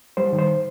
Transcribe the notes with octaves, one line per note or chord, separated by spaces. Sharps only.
G3 C5
D#3
C5